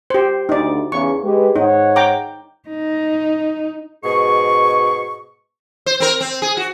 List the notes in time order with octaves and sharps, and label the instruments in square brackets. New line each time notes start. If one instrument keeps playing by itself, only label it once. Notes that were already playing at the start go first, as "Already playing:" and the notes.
[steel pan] G4 C5
[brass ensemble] D2 [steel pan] D#4 D5
[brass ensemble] E2 C#3 [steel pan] C#6
[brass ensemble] G#3 G4 B4
[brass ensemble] G#2 C#5 F#5 [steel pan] D#4
[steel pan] G5 A#5 D6
[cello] D#4
[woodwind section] G#2 B2 G#4 C#6
[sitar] C5
C4 A#4
C4
G#4
F#4